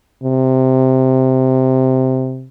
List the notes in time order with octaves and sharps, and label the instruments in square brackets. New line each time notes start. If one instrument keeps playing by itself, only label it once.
[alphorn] C3